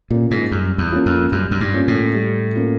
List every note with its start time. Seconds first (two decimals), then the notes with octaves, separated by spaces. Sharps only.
0.10 A#2 A#3 C#4 F4
0.31 G#2
0.52 F#2 G3
0.78 E2
0.92 A#3 C#4 F4
1.06 F2
1.32 F#2 G3
1.51 F#2
1.61 G2
1.73 A#3 C#4 F4
1.88 A2
2.14 G3
2.55 A#3 C#4 F4